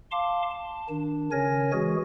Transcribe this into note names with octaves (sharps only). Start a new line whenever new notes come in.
F5 A5 C6 D6
A5
D#3 D4
C#3 C#4 A#4 C#5 G#5 A#6
E3 G#3 F#4 G#4